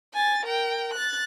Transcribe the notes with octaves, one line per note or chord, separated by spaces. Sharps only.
G#5 A6
A#4 G5
F#6 A6